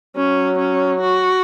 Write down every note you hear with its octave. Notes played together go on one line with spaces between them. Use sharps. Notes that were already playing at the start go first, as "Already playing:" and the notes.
F#3 C#4
C#4
F#4